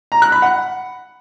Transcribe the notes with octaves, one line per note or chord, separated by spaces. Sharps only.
A#5
F#6
B5
F#5